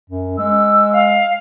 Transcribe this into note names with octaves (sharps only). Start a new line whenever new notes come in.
F#2
G#3 E6
F5